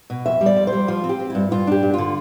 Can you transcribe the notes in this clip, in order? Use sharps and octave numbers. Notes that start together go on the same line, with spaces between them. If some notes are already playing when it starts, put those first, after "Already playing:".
B2
F2 E5
G3
D5
F2
C5
G3
F3 F4
C4
G4
C4
G2 E4
G2 F4
D4 G4
G2
D3 F4